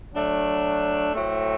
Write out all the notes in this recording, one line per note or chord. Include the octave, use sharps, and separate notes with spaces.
F#3 A3 D4
A2 F#3 A3 C4